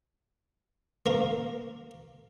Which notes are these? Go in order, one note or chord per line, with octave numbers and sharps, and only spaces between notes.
A#3 A#4